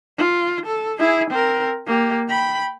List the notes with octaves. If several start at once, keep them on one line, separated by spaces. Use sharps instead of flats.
F4
A4
E4 G#4
C4 A#4
A#3 G4
G5 B5